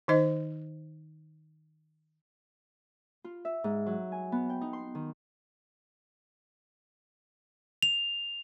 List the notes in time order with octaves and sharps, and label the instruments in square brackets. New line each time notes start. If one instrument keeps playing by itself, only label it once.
[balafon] D#3 D#4 C5 D#5
[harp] F4
E5
G#2
F#3
G#5
B3
G5
D#4
C6
D#3
[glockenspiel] F7